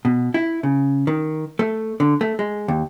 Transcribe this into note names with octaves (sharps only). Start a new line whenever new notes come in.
B2
E4
C#3
D#3
A3
D3
A3
G#3
D#2